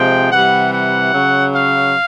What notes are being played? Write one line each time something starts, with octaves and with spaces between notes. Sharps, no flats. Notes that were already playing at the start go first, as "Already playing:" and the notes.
Already playing: C3 F3 G#3 G5
C3 E3 G3 F#5
F#5
C#3 F#3
F5